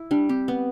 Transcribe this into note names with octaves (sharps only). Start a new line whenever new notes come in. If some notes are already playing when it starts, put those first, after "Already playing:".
Already playing: E4
G3 D4
C4 G4
B3